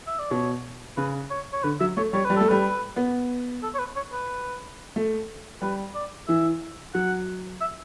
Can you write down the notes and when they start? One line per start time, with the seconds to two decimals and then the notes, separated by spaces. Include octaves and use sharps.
0.07 E5
0.19 D5
0.31 B2 C#5
0.97 C#3 B4
1.31 C#5
1.53 C#5
1.64 D3 B4
1.80 F#3 E5
1.97 A3 C#5
2.13 G3 C#5
2.25 G3 B4
2.37 A3 A4
2.49 G3 B4
2.96 B3
3.63 A4
3.74 C#5
3.79 B4
3.96 C#5
4.13 B4
4.96 A3
5.62 G3 B4
5.95 D5
6.28 E3 E5
6.94 F#3 F#5
7.61 E5